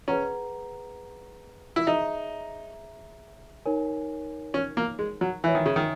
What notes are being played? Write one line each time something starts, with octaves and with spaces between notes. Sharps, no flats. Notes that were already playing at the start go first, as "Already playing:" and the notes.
C#4 G#4 B4 F#5 A#5
E4
D#4 G#4 C#5 E5 A#5
D#4 A#4 C#5 G#5
C#4
A#3
G#3
F#3
E3 C#5 E5 G#5
D#3
C#3
D#3